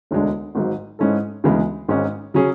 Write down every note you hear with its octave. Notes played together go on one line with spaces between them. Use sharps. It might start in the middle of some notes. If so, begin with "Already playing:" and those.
E1 D2 D3 G#3 D4
G#1 G#2 F#3
G#2 G#3 C#4 E4 A4
D2 C#3 E3 G#3 B3
G#1 G#2 G#3 C#4
C#3 F#3 C#4 G#4